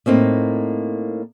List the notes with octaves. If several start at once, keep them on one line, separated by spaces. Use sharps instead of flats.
A2 A#3 C4 D#4